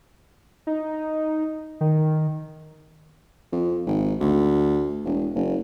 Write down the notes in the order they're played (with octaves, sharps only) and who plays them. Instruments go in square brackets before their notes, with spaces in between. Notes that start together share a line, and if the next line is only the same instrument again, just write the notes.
[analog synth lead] D#4
D#3
[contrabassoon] F2
G#1
D2
E1
F#1